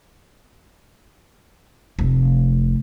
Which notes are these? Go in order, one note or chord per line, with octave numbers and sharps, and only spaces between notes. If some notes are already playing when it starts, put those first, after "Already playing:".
F1 A3